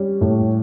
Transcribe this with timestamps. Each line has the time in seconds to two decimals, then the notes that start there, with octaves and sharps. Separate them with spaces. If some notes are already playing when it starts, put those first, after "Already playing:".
Already playing: G3 C#4
0.21 A2